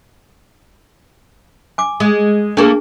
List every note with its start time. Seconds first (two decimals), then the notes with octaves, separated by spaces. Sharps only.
1.78 G#5 D6
2.00 G#3
2.57 A3 A#3 D4 G#4 A4